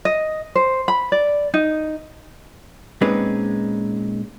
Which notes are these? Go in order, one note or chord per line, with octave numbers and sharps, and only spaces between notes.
D#5
C5
B5
D5
D#4
A#2 G#3 C4 C#4 D#4 B4